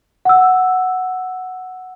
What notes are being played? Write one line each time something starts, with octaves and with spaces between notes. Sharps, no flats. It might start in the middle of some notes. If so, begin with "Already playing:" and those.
F#5 E6